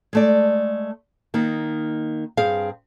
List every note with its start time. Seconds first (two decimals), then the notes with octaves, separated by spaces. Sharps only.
0.13 G#3 A3 D5
1.34 D#3 A#3 D#4
2.37 G2 C4 G#4 F5